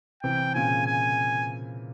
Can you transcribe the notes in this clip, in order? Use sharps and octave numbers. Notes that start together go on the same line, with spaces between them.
C3 E3 G5
A#2 C#3 G#5
G#5